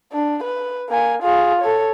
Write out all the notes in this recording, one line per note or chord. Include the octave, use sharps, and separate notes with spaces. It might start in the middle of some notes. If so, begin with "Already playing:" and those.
D4
B4
A#3 G#5
F4 G#4
A4 C#5